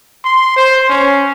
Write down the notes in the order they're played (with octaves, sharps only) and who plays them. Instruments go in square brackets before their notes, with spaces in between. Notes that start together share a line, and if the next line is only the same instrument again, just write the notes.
[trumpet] C6
C5
C#4